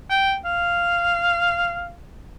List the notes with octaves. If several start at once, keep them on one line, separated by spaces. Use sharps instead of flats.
G5
F5